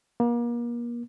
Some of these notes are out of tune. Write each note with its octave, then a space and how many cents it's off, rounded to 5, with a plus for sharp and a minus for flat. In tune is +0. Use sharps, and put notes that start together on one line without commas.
A#3 +35